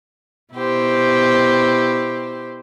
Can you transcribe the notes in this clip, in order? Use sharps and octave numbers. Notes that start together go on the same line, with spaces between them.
B2 E4 G4 C5